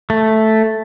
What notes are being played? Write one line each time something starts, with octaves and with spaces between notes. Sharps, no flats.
A3